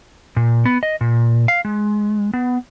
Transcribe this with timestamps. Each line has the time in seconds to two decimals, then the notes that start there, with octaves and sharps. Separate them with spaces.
0.37 A#2
0.65 B3
0.83 D#5
1.01 A#2
1.48 F5
1.65 G#3
2.34 B3